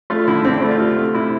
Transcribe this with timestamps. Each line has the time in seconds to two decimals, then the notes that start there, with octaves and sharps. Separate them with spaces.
0.10 A3 F4
0.28 D3 E4
0.45 D3 C4
0.54 D4
0.62 A3 E4
0.71 F4
0.79 C3
0.97 A3
1.14 C3 E4